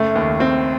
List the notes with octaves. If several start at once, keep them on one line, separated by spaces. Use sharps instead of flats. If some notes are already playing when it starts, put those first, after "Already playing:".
Already playing: F#1 A3
D#2
C4